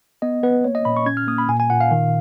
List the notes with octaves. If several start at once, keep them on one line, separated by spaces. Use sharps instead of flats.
B3 D#5
B3 B4
A#3 C#5
D#5
A#2 B5
C#6
C#4 G#6
F6
A#3 D#6
B5
A#2 G#5
G#5
A#2 F#5
F5
D#3